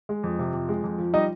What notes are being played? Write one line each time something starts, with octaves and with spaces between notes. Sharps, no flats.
G#3
F2
C3
F2
G#3
F2
F3
G3 D#4 D#5